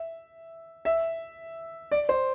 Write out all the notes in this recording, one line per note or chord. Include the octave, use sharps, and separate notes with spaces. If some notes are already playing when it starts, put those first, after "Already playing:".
Already playing: E5
E5
D5
C5